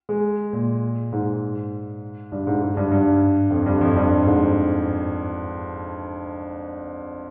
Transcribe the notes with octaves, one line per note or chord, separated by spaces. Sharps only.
G#3
A#2
G#2
G2
G#2
G#2
G2
G2
F2
G2
F2
G2
G2
G#2